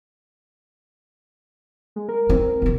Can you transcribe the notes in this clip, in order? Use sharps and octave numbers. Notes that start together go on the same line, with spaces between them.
G#3
A#4
C4
B1 C#3